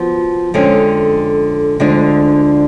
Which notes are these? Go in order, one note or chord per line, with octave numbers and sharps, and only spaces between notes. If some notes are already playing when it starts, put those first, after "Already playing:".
Already playing: F3 B3 F#4
F2 D3 G#3 C#4 G#4
D2 D3 F3 G#3 D4